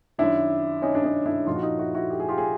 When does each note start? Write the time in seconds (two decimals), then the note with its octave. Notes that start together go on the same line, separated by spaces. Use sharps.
0.18 F#2 D#3 D4 E4
0.82 C#4 D#4
0.95 D4
1.04 C#4 D#4
1.26 D4 E4
1.46 A#2 F3 D#4 F4
1.55 F#4
1.62 D#4 F4
1.79 E4 F#4
1.95 E4 F#4
2.11 G4
2.20 G#4
2.29 F4 G4
2.38 G#4